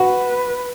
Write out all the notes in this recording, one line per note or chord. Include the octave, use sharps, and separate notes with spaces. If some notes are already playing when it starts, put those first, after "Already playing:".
Already playing: F#4 B4